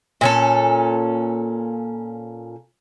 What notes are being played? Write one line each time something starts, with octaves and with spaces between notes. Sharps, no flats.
A#2 C#4 A4